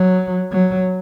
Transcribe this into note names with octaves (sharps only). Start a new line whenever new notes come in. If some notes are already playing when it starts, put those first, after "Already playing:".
Already playing: F#3
F#3